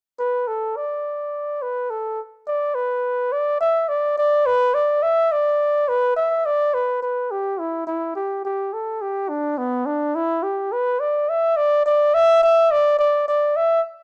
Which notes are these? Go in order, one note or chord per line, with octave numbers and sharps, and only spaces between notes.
B4
A4
D5
B4
A4
D5
B4
D5
E5
D5
D5
B4
D5
E5
D5
B4
E5
D5
B4
B4
G4
E4
E4
G4
G4
A4
G4
D4
B3
D4
E4
G4
B4
D5
E5
D5
D5
E5
E5
D5
D5
D5
E5